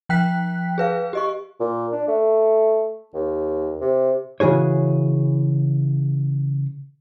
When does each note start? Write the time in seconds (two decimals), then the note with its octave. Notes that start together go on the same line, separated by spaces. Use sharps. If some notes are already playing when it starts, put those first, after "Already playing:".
0.09 F3 G5 F#6 B6
0.78 G#4 B4 F5
1.13 G4 D#5 C#6
1.60 A#2
1.92 D4
2.08 A3
3.14 D#2
3.81 C3
4.40 C#3 E3 F#4 G#4 C#5